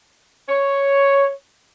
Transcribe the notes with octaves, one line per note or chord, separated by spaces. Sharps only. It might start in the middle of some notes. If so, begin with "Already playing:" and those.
C#5